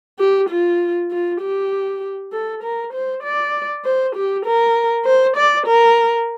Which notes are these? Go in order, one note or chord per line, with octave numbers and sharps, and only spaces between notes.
G4
F4
F4
G4
A4
A#4
C5
D5
C5
G4
A#4
C5
D5
A#4